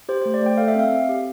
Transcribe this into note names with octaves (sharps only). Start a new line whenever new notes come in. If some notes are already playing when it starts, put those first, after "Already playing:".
G4 C5
C5
A3
D5
A3 G5
A4 F5
E5
C4 F5
C4
G4